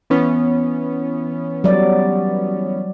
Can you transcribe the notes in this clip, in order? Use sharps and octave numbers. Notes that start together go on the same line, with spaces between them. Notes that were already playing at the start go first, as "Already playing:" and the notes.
E3 B3 C#4
F#3 G3 D5